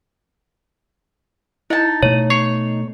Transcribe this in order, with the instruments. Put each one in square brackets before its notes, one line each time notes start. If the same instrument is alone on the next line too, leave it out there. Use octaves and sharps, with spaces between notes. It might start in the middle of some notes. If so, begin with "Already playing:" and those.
[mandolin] D#4 A5 [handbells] E4
[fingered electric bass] B2 A3 [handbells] C#5
[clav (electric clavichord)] C#5 [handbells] C7